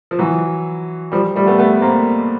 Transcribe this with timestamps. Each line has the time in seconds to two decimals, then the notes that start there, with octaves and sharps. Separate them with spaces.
0.11 F3
0.19 E3 F#3
1.12 F3 G3
1.35 G3 A3
1.47 A3 B3
1.59 A3 B3
1.82 A#3 C4